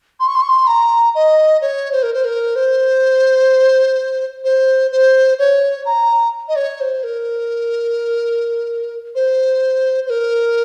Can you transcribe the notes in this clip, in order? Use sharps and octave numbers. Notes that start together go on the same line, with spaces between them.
C6
C#6
C6
C#6
C6
A#5
D#5
C#5
C5
A#4
C5
A#4
C5
C5
C5
C#5
A#5
D#5
C#5
C5
A#4
C5
C5
A#4